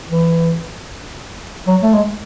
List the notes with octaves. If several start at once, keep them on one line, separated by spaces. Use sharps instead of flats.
E3
F#3
A3
G#3